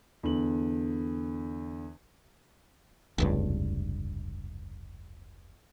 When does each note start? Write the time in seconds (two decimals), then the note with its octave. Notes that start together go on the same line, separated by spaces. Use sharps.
0.23 E2 D3 F#7
3.18 F1 C#2 G2